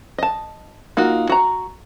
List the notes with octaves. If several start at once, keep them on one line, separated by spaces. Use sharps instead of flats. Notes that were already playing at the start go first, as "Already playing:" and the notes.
D#5 A5
A#3 D#4 F4 F#4
F#4 A#5